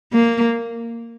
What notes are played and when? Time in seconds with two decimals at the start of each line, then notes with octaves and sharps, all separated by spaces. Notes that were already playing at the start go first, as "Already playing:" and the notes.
0.13 A#3